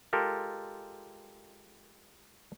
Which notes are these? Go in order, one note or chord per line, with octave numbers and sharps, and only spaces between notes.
G#3 F4 G4 A4 A#4